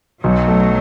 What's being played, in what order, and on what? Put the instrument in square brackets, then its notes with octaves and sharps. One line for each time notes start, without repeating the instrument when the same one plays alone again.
[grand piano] B1 [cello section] F#3
[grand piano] A3